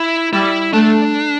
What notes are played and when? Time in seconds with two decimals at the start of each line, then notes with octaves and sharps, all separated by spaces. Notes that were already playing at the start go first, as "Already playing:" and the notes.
Already playing: E4
0.33 G3 E4
0.73 A3 D4